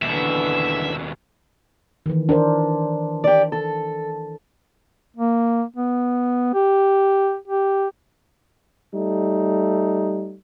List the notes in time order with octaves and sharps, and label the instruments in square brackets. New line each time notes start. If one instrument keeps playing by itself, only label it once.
[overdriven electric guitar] D#2 B2 [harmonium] D3 E3 [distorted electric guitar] E5
[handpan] D#3 E3
D4 A#4 C5
[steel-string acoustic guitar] G4 D5
A4
[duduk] A#3
B3
G4
G4
[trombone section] G3 A3 D#4